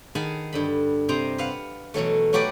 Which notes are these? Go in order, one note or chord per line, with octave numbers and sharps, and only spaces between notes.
D#3 G#4 F#5 G#5 A5 B5
G2 D3 B5
C3 C4 C5 D#5 A#5
B4 F5 F#5
B2 E3 F#3 A3
F#3 A3 F#4 G4 B4 D5